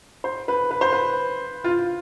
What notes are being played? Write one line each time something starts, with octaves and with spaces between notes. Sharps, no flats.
C5
B4
B4
C5
B4
F4